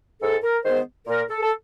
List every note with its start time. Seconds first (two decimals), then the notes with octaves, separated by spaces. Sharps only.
0.21 G#2 A4
0.42 A#4
0.64 D#3 G#3 B3 C5
1.07 A#2 A#4
1.29 A4
1.42 A4